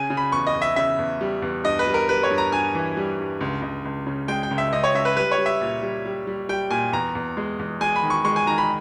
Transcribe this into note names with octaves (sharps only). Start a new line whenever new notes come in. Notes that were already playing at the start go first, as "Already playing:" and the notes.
Already playing: C#3 G#5
C#3
B5
E2 C#6
D#5
E2
E5
C#3 E5
E2
G3
E2
G2 D#5
B4
G3
A#4
G3 B4
C#5
G2
A#5
G2 G#5
E3
G3
G2
C#2
C#2
C#2
C#3
G#3 G5
G5
C#2
E5
C#2 D#5
C#5
C#2 E5
B4
G3 B4
C#5
G3
E5
A#2
G3
G3
G3
G3 G5
A#2 G#5
E2 A#5
E2
G#3
E2
G#3 G#5
B5
D#3
C#6
G#3 C#6
G#5
D#3 A#5
B5